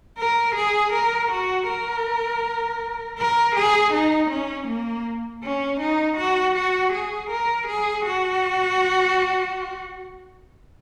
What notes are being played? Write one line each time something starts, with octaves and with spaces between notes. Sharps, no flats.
A#4
G#4
A#4
F#4
A#4
A#4
G#4
D#4
C#4
A#3
C#4
D#4
F#4
F#4
G#4
A#4
G#4
F#4